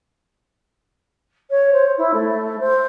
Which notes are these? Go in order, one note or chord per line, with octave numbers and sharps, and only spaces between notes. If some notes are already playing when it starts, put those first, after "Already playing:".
C#5
C5
E4
A3
C5